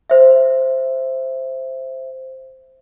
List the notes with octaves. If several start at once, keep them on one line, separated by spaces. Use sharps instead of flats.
C5 E5